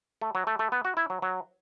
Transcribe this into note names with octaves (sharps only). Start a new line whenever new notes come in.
A3
F#3
A3
A3
B3
F#4
E4
F#3
F#3